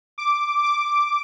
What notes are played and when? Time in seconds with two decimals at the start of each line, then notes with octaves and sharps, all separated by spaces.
0.18 D6
0.63 D6